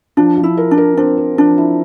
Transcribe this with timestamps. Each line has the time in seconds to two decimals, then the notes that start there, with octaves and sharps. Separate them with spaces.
0.17 F3 D4
0.37 F3
0.43 E4
0.57 A#4
0.71 D4
0.77 A#4
0.97 C4 D4
1.17 C4
1.38 F3 D4
1.58 E4